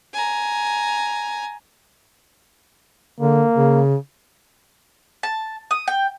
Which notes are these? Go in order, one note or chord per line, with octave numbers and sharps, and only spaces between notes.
G#5 A#5
D3 A#3
C#3
A5
D#6
G5